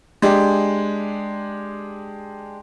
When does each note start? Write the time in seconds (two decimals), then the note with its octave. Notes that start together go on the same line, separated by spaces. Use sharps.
0.22 G#3 D4 G4